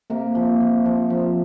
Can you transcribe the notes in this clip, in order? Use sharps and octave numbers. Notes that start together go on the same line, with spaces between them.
C3 A#3
F3
F3
F3
F3